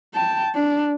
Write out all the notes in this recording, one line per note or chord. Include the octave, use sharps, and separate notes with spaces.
G5 A5
D4